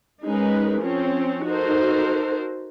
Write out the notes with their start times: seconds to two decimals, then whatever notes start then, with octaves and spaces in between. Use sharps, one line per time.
0.24 G#3 C#4 D#4 G#4 A#4 B4
0.80 F3 C4 C#4 C#5
1.46 D#4 F#4 A4 A#4 C5